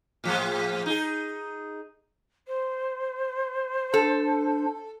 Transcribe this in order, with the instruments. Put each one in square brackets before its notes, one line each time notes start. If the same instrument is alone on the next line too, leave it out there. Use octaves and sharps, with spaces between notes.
[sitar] A2 F3 G#3
D#4 G#4
[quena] C5
[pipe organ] D4 [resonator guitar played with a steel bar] A4